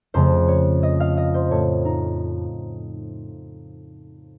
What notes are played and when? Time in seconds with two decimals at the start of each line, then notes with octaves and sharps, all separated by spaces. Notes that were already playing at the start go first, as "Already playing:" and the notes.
0.14 F2 C#3 A3 C5
0.48 C#5
0.83 D#5
1.00 F5
1.17 D#5
1.34 C5
1.51 A2 A3 C#5
1.85 D#4